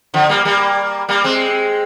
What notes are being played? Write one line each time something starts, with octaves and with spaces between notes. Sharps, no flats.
D3 F3
G3 A#3
G3 A#3
G3 A#3
G#3 C4